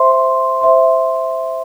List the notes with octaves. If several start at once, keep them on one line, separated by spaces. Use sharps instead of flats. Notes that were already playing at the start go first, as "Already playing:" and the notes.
Already playing: C5 E5 C6
C5 E5 C6